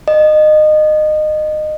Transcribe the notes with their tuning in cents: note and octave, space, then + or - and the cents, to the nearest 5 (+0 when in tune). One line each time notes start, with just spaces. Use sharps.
D#5 -25